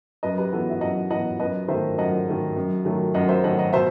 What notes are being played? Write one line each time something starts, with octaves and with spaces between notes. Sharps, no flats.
F#2 B4 D#5
G4 B4
E3 B3 F#4 A4
E5
F#2 D#5 F#5
E3 B3 D#5 F#5
F#2 B4 D#5
D#3 A3 C5 E5
F#2 D#5 F#5
D#3 A3
F#2
D#3 F#3 A3
F#2 D#5 F#5
C5 E5
D#3 F#3 A3 D#5 F#5
D#5 F#5
B2 C5 E5